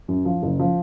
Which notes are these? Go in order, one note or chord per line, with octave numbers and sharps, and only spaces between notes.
F#2
F3
F#1
F3